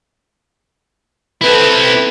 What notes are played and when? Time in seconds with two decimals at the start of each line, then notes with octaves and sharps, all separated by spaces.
1.41 C4 E4 A4 B4